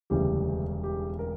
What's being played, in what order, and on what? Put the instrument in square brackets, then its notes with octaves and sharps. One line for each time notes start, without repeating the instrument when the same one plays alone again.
[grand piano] E1 D2 C#3 E3 G3 G4
G4
A#4